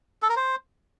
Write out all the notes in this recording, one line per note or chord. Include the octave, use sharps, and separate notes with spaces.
A4
A#4
C5